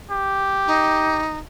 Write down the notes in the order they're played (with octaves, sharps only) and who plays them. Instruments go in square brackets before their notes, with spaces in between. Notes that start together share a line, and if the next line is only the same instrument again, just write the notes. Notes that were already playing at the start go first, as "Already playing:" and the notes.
[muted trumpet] G4
[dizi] D#4